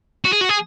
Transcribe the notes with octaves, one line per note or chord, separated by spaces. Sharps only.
F#4
G#4
F#4
G#4